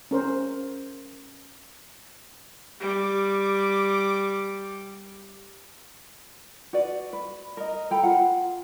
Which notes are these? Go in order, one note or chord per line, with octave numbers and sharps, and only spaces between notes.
C#4 A#4 C5
G3 D6
F#4 B4 D5
B4
A#4 D#5
A4 G5 A#5 B5
F4 F#5